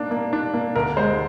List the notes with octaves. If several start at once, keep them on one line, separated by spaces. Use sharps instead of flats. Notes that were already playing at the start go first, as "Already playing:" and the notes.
Already playing: A#3 D4
A#3
D4
A#3
D2 A#4
G#3 C5